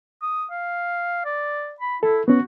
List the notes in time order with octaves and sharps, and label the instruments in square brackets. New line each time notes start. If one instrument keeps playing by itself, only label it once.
[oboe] D#6
F5
D5
B5
[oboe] E4 [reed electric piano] A4
[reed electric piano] B3 C#4 [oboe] F#4